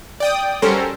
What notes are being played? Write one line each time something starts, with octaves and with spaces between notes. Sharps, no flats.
D5 G5 D#6
F#3 G3 C#4 A4 A#4 C5